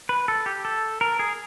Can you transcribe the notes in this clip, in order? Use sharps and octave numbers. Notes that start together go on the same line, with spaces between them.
B4
A4
G4
A4
A#4
G#4